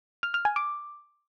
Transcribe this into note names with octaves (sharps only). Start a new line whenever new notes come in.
F6
F6
G#5
D6